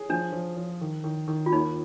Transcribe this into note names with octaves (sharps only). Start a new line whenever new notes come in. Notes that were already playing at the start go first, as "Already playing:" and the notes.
Already playing: G#4
F3 D4
F3
F3
D#3
D#3
D#3
F4
D#2 D#4